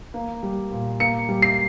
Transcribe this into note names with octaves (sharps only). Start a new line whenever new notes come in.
A#3
G3
A#2
A#3 C#7
G3
C7